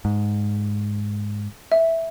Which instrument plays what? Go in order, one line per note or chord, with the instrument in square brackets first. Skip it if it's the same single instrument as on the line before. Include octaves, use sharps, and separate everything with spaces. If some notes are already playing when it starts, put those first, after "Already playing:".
[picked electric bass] G#2
[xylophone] E5